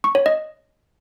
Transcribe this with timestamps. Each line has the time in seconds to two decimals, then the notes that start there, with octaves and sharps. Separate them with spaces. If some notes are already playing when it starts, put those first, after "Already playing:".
0.04 C#6
0.15 C#5
0.26 D#5